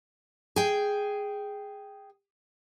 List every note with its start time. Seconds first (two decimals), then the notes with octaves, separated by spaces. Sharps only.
0.56 G#4 G5